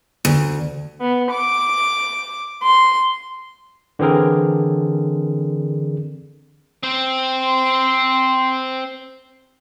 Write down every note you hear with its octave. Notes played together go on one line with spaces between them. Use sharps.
D2
B3
D6
C6
D3 E3 C4 G#4 A#4
C4 C5
C6